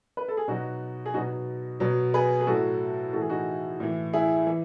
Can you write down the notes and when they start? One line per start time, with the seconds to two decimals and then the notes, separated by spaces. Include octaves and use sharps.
0.17 B4
0.28 A4
0.37 G#4
0.48 B2 F#3 D#4 F#4
1.06 G#4
1.14 B2 F#3 D#4 F#4
1.80 B2 F#3
2.14 G#4 B4
2.41 G#4
2.47 A2 F#3 F#4 A4
3.13 A2 F#4 A4
3.16 E3
3.21 G#4
3.29 D#4 F#4
3.80 A2 E3
4.13 E4 G#4
4.47 E3